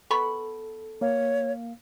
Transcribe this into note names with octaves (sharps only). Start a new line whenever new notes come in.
B3 A4 B5 C#6
A#3 C#5 F5